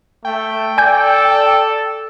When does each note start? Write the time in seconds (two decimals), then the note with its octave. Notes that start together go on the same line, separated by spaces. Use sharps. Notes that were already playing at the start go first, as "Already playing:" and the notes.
0.25 A3 G5
0.78 A4 D5 G#5 G6